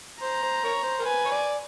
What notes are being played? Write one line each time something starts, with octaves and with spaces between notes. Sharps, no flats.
C5 A#5
C5
A#4 C#5
C5
A#4
B4 G#5
C#5
D5